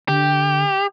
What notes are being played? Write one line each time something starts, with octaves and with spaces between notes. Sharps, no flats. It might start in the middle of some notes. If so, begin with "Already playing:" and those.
D3 G4